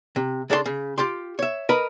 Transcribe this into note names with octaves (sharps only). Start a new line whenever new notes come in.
C3
C#3 D4 A4 D5 C6
C#3
F4 G4 G5 C6
C#5 E5
A#4 B4 D#5 A#5 B5